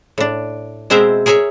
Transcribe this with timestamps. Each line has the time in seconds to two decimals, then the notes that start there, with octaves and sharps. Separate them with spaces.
0.18 A2 D4
0.90 B2 G#3 C4 A#4 C5 E5
1.26 G#4 A#4 C#5 E5 G#5